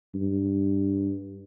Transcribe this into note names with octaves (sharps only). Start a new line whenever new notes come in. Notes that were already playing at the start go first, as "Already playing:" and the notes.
G2